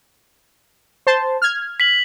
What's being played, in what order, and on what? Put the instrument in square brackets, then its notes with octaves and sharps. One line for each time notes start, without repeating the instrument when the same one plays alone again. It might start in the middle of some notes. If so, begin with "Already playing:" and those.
[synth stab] C5 A5 C6
F6 G#6
[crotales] B6 F#7